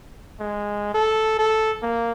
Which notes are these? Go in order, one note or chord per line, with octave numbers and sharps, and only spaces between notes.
G#3
A4
A4
A#3